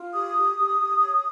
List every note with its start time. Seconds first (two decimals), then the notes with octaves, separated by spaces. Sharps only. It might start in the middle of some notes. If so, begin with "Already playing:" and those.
Already playing: F4
0.13 G4 D#6
0.36 G4
0.58 G4
0.80 G4
1.00 C#5